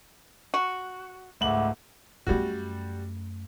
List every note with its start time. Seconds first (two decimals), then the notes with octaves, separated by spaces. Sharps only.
0.54 F#4
1.41 C#2 G#2 A3 E5 F#5 D6 F#7
2.27 F#2 G3 A3 F#4